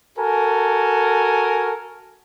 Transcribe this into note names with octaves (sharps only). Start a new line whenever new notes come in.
F#4 A4 A#4 G#5